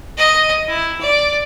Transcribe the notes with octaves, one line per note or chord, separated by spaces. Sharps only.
D#5
E4
D5